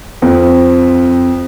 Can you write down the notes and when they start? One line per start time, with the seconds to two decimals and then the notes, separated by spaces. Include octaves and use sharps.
0.22 F2